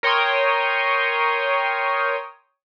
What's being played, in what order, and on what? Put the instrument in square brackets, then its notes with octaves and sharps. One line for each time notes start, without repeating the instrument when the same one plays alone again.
[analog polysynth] A#4 C#5 G5 C6 D#6